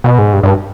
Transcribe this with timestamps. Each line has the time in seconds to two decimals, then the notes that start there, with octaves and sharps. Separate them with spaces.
0.04 B2
0.19 G#2
0.33 G2
0.43 G2